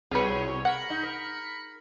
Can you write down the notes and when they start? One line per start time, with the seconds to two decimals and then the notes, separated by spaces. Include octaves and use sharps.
0.11 C2 B2 F#3 F4 G#4 B4 C#5
0.65 A#4 F#5 B5 C#7
0.90 D#4
1.03 A#4